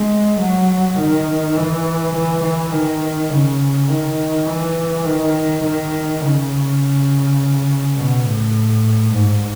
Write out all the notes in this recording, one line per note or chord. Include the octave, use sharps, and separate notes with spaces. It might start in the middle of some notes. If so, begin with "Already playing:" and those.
Already playing: G#3
F#3
D#3
E3
E3
E3
D#3
C#3
D#3
E3
D#3
D#3
C#3
B2
A2
G#2